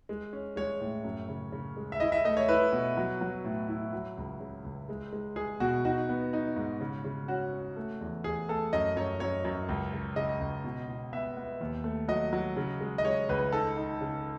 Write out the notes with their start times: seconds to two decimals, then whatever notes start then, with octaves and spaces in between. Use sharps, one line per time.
0.09 G#3
0.33 C#4
0.56 G#3 C#5
0.81 A2
1.04 F#2
1.29 C#3
1.52 C#3
1.77 G#3
1.92 E5
2.00 E4 D#5
2.12 E5
2.25 A3 D#5
2.37 C#5
2.49 E4 B4
2.73 B2
2.97 F#3
3.21 F#3
3.44 A2
3.68 E4
3.93 F#3
4.17 C#2
4.40 C#3
4.65 C#2
4.89 G#3
5.13 G#3
5.36 G#3 G#4
5.60 B2 F#4
5.85 D#4 F#4
6.09 B3
6.33 D#4
6.56 G#2
6.80 C#3
7.04 C#3
7.28 C#4 F#4
7.53 C#4
7.76 A3
8.01 E2
8.24 E2 G#4
8.48 A3 A4
8.73 F#2 D#5
8.96 F#2 C#5
9.20 F#2 C#5
9.45 F#2
9.69 C#2
9.93 C#3
10.16 C#3 D#5
10.40 C#2
10.64 B2
10.89 B2
11.13 B3 E5
11.37 B3
11.61 D#2
11.84 A3
12.08 F#3 D#5
12.33 F#3
12.57 C#3
12.81 G#3
12.98 D#5
13.04 G#3 C#5
13.29 C#2 B4
13.53 D#4 A4
13.77 D#4
14.01 C#3